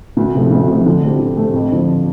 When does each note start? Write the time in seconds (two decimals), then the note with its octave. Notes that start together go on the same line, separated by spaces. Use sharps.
0.17 D2
0.34 C3 F3 A3
0.51 D2
0.68 C3 F3 A3
0.86 D3
1.03 A3 C4 G4
1.19 D3
1.37 A3 C4 G4
1.54 F2
1.71 D3 F3 A3 C4